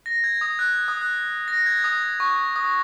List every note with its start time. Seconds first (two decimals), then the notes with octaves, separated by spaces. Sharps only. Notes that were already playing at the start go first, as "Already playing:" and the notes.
0.06 A#6
0.24 G#6
0.41 D#6
0.59 F#6
0.88 D#6
1.01 F#6
1.48 A#6
1.66 G#6
1.84 D#6
2.20 C#6
2.56 D#6